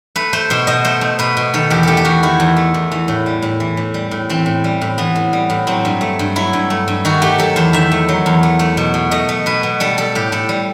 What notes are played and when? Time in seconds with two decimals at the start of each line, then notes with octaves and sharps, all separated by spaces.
0.16 A3 B4
0.33 A3 C5
0.50 B2 C5
0.67 B2 D#5
0.85 A3 C5
1.01 A3
1.19 B2 B4
1.37 B2
1.54 D#3 A4
1.70 E2 G4
1.83 A3 G4 A4
1.97 G4
2.05 E2 F#4
2.23 D#3 E4
2.40 E2
2.57 A3
2.74 E2
2.92 E3
3.08 A2
3.26 G3
3.42 A2
3.60 E3
3.77 A2
3.94 G3
4.11 A2
4.29 E3 C4
4.46 A2
4.64 G3
4.81 A2
4.98 E3 B3
5.16 A2
5.33 G3
5.50 A2
5.67 F#3 C4
5.85 G2
6.01 A3
6.19 G2
6.36 F#3 E4
6.53 G2
6.70 A3
6.88 G2
7.05 D#3 F#4
7.22 A3 G4
7.38 F#3 A4
7.56 E2 C5
7.73 D#3 E5
7.92 A3
8.08 F#3
8.26 E2
8.43 A3
8.59 A3
8.77 B2
8.94 B2
9.11 A3 D#5
9.29 A3
9.46 B2 B4
9.63 B2
9.80 G3 A4
9.98 G3 A4
10.15 A2 G4
10.32 A2 A4
10.49 G3